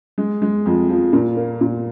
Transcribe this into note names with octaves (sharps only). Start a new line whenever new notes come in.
G#3
G#3
F2
F3
A#2
A#3
A#2